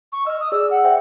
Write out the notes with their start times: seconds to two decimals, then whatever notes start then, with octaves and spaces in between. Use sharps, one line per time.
0.12 C#6
0.26 D#5 E6 F6
0.40 D#6
0.52 G#4 D5 E6
0.71 F#5
0.84 C5 E5 G5